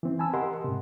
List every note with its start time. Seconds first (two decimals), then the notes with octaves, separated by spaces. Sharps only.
0.03 E3 C4
0.19 G#5 A5 B5 E6
0.33 G4 A#4 D#5 F#5 C6
0.64 G#2 C3